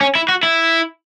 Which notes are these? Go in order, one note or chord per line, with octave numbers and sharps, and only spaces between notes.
C#4
E4
F#4
E4